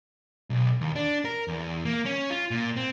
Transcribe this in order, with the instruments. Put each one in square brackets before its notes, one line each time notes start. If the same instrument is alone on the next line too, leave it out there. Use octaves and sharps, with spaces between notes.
[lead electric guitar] B1
D#2
D4
A#4
E2
A#3
C#4
F4
A#2
C4